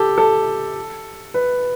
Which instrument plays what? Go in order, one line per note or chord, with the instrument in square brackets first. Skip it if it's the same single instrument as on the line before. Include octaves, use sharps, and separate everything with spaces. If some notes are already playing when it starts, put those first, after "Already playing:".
Already playing: [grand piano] G4 A4
A4
B4